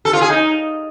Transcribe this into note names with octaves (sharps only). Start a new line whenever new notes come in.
A4
F4
G#4
D#4